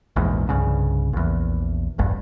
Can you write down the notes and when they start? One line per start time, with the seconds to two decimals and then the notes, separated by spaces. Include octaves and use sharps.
0.16 A#1 E2 G#2
0.49 C2 G2 C#3
1.13 A#1 E2
1.98 E1 A1 G2